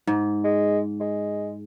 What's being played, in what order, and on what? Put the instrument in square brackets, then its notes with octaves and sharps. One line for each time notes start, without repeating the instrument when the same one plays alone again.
[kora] G#2
[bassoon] G#3
G#3